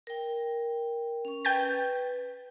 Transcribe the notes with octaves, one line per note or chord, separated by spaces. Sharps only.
A#4 G5
C#4 C#6
B4 G5 G6 A6